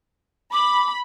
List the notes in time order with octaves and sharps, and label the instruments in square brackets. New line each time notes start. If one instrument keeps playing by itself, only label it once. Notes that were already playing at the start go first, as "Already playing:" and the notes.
[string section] B5 [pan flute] D6